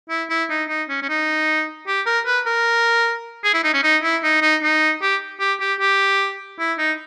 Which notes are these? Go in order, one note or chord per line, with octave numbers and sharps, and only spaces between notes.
E4
E4
D#4
D#4
C#4
C#4
D#4
G4
A#4
B4
A#4
G#4
E4
D#4
C#4
D#4
E4
D#4
D#4
D#4
G4
G4
G4
G4
E4
D#4